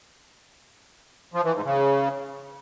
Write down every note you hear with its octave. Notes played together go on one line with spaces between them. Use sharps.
F3
E3
G#2
C#3